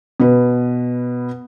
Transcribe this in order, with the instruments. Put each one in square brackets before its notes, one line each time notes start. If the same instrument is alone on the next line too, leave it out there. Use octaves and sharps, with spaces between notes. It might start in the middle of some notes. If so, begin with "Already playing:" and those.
[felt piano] B2 B4